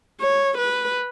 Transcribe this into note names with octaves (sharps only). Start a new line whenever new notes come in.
C#5
B4